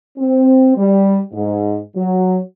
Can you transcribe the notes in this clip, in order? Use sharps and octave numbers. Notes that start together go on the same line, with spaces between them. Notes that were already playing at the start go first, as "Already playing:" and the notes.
C4
G3
G#2
F#3